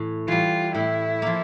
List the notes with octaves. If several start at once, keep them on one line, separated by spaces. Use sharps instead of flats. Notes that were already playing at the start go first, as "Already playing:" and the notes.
Already playing: A2 E3
E3 G3 F4
A2 E4
F3 A#3